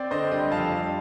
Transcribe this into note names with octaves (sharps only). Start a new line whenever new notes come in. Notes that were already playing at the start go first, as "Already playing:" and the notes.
Already playing: C4 D5
D3 C5 D#5
G3 D#5 G5
F2 F5 A5
G3